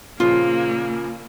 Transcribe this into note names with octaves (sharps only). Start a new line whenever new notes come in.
A#2 C#3 F3 A#3 F4